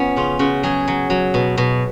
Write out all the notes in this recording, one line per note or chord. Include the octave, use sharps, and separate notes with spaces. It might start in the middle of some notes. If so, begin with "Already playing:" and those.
Already playing: F3 B3 C#4
C#3 F4
C#3 F#4
F#3 G#4
F#3
F#3
B2
B2